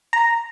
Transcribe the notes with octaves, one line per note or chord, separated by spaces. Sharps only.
A#5